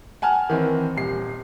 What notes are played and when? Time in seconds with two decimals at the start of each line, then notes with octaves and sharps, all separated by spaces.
0.22 F#5 G#5 A5 F6
0.50 D#3 E3 C4
0.97 D#1 C7